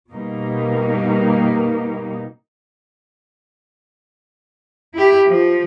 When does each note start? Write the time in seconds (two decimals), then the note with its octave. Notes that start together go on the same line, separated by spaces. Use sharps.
0.11 B2 G3 A#3 D#4
4.94 E4 G4
5.27 F3